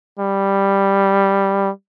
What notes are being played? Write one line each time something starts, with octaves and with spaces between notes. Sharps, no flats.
G3